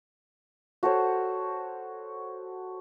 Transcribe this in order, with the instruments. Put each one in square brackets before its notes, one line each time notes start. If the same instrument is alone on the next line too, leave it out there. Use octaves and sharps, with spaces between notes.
[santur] F#4 A4 C5 C#5